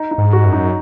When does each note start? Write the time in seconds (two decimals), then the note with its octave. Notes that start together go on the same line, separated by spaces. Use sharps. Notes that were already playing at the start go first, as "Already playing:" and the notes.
Already playing: D#4
0.11 D#4
0.18 G#2
0.33 F#4
0.46 F#2
0.53 D#4